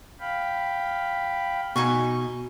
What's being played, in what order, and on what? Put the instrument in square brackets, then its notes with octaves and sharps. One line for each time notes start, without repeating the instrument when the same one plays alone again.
[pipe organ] F5 G5 B5
[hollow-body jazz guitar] B2 [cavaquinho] D#4 G#5 C#6